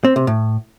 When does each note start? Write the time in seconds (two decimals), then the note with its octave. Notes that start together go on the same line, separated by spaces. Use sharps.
0.05 C4
0.16 C3
0.27 A2